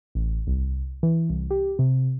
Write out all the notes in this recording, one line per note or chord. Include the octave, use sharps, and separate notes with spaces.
A1
C2
E3
C2
G4
C3